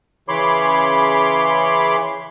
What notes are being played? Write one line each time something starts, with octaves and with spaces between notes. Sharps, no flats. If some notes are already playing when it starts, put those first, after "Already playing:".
C#3 E3 C#5 B5 C6 D6